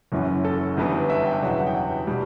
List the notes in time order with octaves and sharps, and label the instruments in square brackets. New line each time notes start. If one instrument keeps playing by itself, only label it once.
[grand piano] F#1 F#2 E3
A4
G1 G2 E3 B3
E5
G5
F#1 E2 B2 F#3 F#5
E5
F#5
G5
F#5
B2 G3